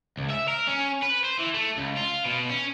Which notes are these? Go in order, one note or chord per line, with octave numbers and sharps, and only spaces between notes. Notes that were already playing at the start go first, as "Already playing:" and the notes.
C#2
E5
A#4
C#4
B4
C5
E3
A3
C#2
F4
B2
C#4